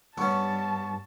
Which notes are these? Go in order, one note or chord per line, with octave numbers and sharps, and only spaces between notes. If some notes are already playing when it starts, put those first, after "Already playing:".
G2 B3 C#4 A5 C#6